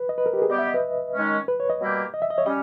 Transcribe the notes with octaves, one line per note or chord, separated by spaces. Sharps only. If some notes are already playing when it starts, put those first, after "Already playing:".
Already playing: B4
D#5
B4
A#4
G4
G#4
G3 B3 G4 D#5
E5
D#5
B4
D#3 G#3 C#4
B4
C#5
D#5
B2 G3 A#3 E4 G4
D#5
E5
D#5
C#5
G3 C#4 D#5